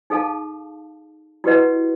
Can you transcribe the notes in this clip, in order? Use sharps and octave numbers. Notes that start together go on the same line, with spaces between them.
D#4 G#4 A4 F5 A5
E4 F#4 G4 B4 D#5 F#5